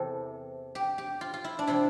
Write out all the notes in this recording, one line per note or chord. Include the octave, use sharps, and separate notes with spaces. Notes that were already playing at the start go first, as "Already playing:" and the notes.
Already playing: E2 C3 E3 A4
G4
G4
F4
F4
E4
D4
C3 F3 E4